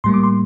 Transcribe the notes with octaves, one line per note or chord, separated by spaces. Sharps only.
A2 G3 A#3 C6
D6
C6